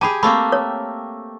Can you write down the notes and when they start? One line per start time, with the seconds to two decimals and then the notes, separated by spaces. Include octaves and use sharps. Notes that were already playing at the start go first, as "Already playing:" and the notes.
0.01 G4 G#4 A5 B5
0.23 A3 A#3 C4 B5
0.52 C#5